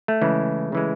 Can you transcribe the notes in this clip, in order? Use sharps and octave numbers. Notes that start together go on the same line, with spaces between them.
A3
C#3 E3 G#3
C#3 E3 G#3